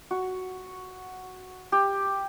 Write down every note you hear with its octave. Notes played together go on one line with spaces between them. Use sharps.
F#4
G4